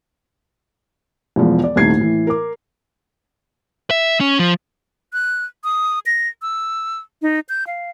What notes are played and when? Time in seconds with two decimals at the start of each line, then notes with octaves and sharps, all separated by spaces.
1.36 E1 E2 F3 G#3
1.64 D5
1.76 D#1 C2 A3 D#4 G#6 C7
1.97 A2 E3
2.27 A#4 D6
3.91 E5
4.20 C#4
4.39 F3
5.13 F#6
5.64 D#6
6.06 A#6
6.42 E6
7.22 D#4
7.49 G6
7.67 F5